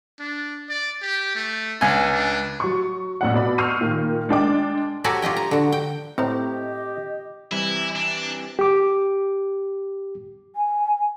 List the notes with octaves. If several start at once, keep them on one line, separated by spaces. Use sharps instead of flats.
D4
D5
G4
A3
C#2 D4 G#5
D4
F#3 C#6
A#1 F2 F#5
B2 D5 B5
C#6 E6 F6 G6 C7 D#7
A#2 D#3
G#3 D4 G5 D6
F#4 G4 A4 C#5 G#5 A#5
F4 G4 D#5 G5
A#5
D3 F#4
G5
A2 C4 G4 C5 D#5 A#5
C3 E3 G3 E4
D4
G4 D6
G#5